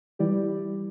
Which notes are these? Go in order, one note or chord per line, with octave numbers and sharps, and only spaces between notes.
E3 G3 E4 G4 D5